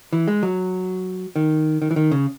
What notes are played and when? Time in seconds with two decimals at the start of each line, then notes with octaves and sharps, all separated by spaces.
0.13 E3
0.28 G#3
0.43 F#3
1.36 D#3
1.82 D#3
1.91 E3
1.96 D#3
2.11 C#3